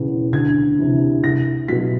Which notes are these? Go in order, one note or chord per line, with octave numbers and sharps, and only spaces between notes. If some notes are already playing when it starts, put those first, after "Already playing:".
Already playing: E1 E2 C#3
D2 G#6
C3 E3
C2 A#6
B2 F#3 B6